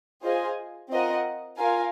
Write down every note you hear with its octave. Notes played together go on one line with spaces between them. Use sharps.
F4 G#4 C5 D#5 G#5
C4 F4 A#4 D#5 F#5
F4 A#4 F5 G#5